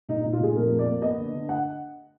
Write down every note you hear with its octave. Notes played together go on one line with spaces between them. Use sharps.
A#2 D#4
A#2 D#4
F4
A#2 G#4
F2 A#4
A#3
D5
A#3
B3 D#5
D3
D3
F#5